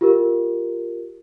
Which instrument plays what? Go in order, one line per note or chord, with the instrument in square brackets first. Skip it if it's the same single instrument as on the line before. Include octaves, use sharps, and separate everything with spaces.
[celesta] F4 G4 A#4